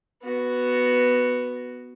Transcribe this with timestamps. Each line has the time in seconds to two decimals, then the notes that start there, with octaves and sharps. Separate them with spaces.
0.23 B3 F#4